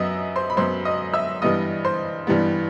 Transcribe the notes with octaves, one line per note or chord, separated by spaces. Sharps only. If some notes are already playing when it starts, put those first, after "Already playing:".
Already playing: F#2 F#3 B3 D#5 E5 D#6 E6
C5 C6
B5
F#2 F#3 B3 C5 C6
D#5 D#6
E5 E6
G2 E3 G3 B3 D#5 D#6
C5 C6
G2 E3 G3 B3